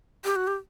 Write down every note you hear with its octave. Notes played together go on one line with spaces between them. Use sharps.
G4
F#4
G4